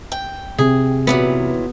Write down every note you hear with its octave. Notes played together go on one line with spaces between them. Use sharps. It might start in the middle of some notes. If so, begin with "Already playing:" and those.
G5
C3 G#4
A#2 E3 F#3 B3